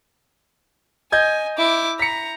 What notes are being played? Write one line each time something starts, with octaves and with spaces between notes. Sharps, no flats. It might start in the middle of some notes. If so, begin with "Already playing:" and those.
D#5 G#5 G6 G#6
E4 D6
A#5 B6 C#7